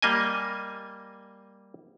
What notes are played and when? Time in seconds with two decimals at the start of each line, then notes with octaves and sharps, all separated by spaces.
0.02 G3 A#3 D#5 G#5